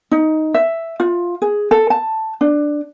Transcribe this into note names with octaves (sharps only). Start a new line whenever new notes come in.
D#4
E5
F4
G#4
A4
A5
D4